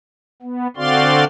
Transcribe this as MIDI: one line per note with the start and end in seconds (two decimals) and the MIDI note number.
0.42 0.67 59
0.77 1.24 50
0.77 1.24 60
0.77 1.24 66
0.77 1.24 74
0.77 1.24 77
0.77 1.24 84